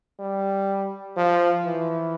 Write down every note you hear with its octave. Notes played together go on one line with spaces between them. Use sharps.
G3
F3
E3